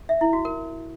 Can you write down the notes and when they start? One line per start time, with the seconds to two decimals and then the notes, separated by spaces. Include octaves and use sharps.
0.09 E5
0.21 E4
0.33 F#4
0.45 A#4